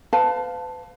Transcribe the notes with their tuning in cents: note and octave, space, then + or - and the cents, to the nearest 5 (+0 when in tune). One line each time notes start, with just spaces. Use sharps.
B4 +40 F5 +15 A5 +0